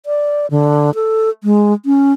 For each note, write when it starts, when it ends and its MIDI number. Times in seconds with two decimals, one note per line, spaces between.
0.06 0.47 74
0.51 0.94 50
0.95 1.30 69
1.44 1.73 56
1.86 2.13 61